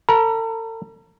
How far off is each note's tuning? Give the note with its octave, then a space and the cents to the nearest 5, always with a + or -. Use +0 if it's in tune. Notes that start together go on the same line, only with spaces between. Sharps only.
A4 +40 A#5 +45